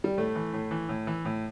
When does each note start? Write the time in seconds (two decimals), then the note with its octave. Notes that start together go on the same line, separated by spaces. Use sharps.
0.04 G3
0.18 A2 A3
0.35 E3
0.53 A2
0.71 E3
0.89 A2
1.07 E3
1.25 A2